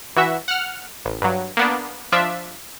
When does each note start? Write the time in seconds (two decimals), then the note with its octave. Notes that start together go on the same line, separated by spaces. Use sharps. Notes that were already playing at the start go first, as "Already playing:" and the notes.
0.16 E3 F#4 E5
0.48 F#5 F6
1.05 A1
1.22 G2 F#3
1.57 A#3 B3 D4
2.12 F3 D4 F4 E5